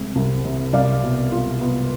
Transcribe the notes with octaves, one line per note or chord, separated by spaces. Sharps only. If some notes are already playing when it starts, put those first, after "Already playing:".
Already playing: C2 C3 G#3 C4
C2
C3
C2 D5 F5
B2
F4
B3